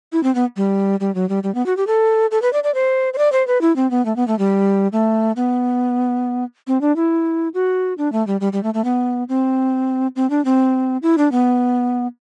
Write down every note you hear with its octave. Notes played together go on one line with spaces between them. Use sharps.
E4
C4
B3
G3
G3
F#3
G3
G3
B3
F#4
G4
A4
A4
B4
D5
D5
C5
C5
D5
C5
B4
E4
C4
B3
A3
B3
A3
G3
A3
B3
C4
D4
E4
F#4
D4
A3
G3
G3
G3
A3
A3
B3
C4
C4
D4
C4
E4
D4
B3